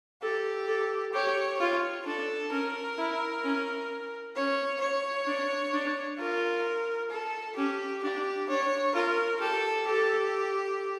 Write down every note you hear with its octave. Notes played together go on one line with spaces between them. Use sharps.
G4 A4
A4
G4 C#5
F4 C#5
D4 A4
C#4 A#4
E4
C#4
C#4 C#5
C#5
D4
D4
F4 A#4
A4
C#4 G4
D4 G4
D4 C#5
F4 A#4
G4 A4
G4 A4